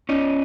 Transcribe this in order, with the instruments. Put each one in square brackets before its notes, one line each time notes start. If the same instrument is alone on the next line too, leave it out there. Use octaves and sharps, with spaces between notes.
[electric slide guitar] C#4 D#4